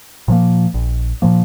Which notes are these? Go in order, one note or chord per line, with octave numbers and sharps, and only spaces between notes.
A#2 F3 A#3
A#1
A#2 F3 A#3